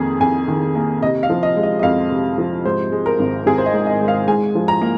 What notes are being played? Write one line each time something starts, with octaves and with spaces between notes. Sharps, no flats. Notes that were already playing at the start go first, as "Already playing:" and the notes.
Already playing: F2 D#3 A#3 G#4
F2 G#5
D#3
A#3
C3 D#5
F5
F3
D#5
G#3
D#5
D#5
F2 F5
C3
F3
G#2 C5
G#3
A#4
G#1
G#1 G#4
C5
D#5
G#2
D#5
G#3
F5
G#2 G#5
F3
A#5
A#3